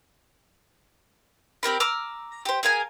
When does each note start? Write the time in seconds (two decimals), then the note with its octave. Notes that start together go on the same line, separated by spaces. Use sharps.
1.63 C4 G4 A#4 B5
1.80 A#5 D6 E6 F6
2.45 G4 C5
2.63 G#4 A#4 F5 G#5